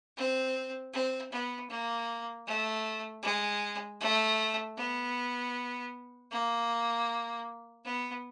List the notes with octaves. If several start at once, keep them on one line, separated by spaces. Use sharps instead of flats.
C4
C4
B3
A#3
A3
G#3
A3
B3
A#3
B3